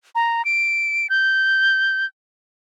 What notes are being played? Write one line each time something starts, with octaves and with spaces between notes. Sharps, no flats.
A#5
D7
G6